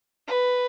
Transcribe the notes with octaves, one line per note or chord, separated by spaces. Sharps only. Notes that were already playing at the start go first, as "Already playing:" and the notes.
B4